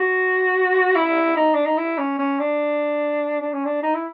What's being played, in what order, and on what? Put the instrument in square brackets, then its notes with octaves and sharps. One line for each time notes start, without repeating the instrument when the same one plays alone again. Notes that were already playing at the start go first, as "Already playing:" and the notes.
Already playing: [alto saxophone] F#4
E4
D#4
D4
D#4
E4
C#4
C#4
D4
D4
C#4
D4
D#4
E4